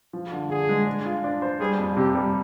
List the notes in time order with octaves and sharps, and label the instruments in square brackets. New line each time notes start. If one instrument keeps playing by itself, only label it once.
[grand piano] F3
D3
[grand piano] D3 [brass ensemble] G#4
[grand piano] G#3
D4
F4
D4
C5
[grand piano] G3 [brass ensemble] G#4
[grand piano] F2
[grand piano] C3 [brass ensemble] G4
[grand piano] G3